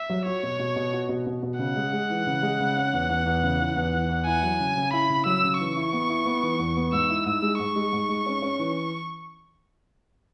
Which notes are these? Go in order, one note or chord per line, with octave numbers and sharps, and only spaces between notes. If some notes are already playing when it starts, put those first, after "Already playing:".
Already playing: E5
F#3
F#4 C#5
B2
B2
B2
F#4
B2
B2
B2
C#3 F#5
G#3
G#3
E3
C#3
G#3
C#3
C#4
E2
E2
E2
C#3
E3
E2
E3
E2
E4 G#5
F#3
C#3
C#3
E4 B5
C#3
F#3 E6
C#3
E3 C#6
E4
B3
E4
B3
E3
E2
B3
G#2 E6
E4
G#2 E6
G#3
G#2 C#6
G#3
G#2
G#3
C#4
C#4
E3